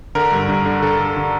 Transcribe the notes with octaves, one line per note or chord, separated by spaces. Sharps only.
D3 A#4
G2
G2
D3
D3 A4
D3
D3